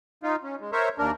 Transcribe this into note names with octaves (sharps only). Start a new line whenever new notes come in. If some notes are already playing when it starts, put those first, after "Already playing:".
D#4 F4
C#4
G#3
A#4 C5 C#5 E5
D#2 D4 A#4